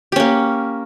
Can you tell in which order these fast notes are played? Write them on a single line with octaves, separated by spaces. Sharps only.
G4 C#4 A#3